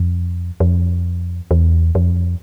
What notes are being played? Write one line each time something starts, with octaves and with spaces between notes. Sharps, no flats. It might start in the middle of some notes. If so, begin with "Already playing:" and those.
Already playing: F2
F2
E2
F2